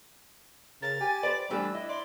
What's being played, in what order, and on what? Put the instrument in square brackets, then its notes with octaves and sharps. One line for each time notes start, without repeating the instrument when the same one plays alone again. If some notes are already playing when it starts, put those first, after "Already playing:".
[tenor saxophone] C#3 [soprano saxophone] A#4 [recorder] A6
[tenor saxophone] G4 [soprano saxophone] G#5
[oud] B4 C5 [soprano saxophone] D5
[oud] E3 A3 D4 [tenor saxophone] G3 [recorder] E6
[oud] D4 [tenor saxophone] E4 [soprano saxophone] D#5
[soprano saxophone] D5 [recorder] C6